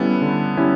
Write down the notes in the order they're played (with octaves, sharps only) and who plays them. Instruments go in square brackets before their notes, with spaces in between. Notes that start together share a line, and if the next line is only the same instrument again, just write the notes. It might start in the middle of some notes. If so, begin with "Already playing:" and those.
Already playing: [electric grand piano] D3 G3 C#4 E4 [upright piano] B3
[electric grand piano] D3
G3 C#4 E4